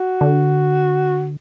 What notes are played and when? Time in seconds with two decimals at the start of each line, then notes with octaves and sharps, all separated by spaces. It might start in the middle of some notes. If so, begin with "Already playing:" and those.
Already playing: F#4
0.21 D3